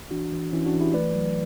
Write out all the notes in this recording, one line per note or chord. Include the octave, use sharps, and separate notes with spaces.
E3 D4 F#4
E3
E3 C#4 E4
D4 F#4
E3
E4 G4
A3 B4 D5
F#3